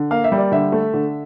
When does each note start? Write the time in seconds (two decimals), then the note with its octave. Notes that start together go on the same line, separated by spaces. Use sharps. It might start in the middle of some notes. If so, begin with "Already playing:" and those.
Already playing: D3
0.11 A#3 F5
0.24 E5
0.32 G3
0.38 D5
0.52 D3 E5
0.72 A3
0.94 D3